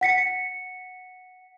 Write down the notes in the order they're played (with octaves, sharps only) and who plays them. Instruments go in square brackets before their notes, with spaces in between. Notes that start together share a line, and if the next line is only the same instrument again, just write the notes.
[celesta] F#5 B6 C#7